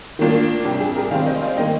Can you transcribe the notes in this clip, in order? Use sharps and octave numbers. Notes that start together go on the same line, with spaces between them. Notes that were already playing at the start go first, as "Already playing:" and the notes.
D#3 A#3 D4 F4
C3 G3 D4 G4
G#4
G4 A#4
D#3 G#3 C4 D5 F5
C5 D#5
D5 F5
D#3 A#3 D#5 G5